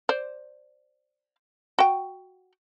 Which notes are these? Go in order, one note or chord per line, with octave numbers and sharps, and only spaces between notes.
C5 D5
F#4 G5